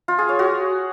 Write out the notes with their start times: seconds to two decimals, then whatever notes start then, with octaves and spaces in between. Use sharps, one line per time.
0.08 F4
0.18 G#4
0.29 C#5
0.39 F#4